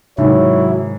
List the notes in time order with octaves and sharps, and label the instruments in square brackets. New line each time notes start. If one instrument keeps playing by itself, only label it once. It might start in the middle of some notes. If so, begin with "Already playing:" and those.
[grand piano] G#2 D#3 [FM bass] C3 [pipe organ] F#3 E4 [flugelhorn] C#5